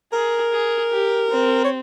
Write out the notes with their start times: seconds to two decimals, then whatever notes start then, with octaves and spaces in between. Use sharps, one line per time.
0.13 G#4 A#4
0.52 G#4
0.92 G4
1.30 C4
1.65 C#5